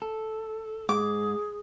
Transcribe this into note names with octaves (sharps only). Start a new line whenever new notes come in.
A4
G#2 G#4 D6